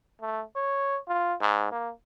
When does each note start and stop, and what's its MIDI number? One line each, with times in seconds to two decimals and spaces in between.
0.22 0.43 57
0.56 0.98 73
1.08 1.34 65
1.41 1.70 44
1.72 1.91 58